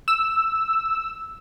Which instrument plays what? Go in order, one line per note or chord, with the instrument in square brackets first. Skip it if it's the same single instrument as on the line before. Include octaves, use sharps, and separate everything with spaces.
[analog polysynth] E6